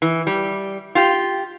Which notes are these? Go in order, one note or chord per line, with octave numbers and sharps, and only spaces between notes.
E3
G3
F4 G4